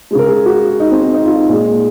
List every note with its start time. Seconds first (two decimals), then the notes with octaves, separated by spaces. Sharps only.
0.11 G#3 G#4
0.15 C#3 A#4
0.26 G#4
0.46 F#4
0.80 D#4
0.91 C4
1.02 C4
1.14 D#4
1.25 F4
1.37 D#4
1.48 A#2 G#3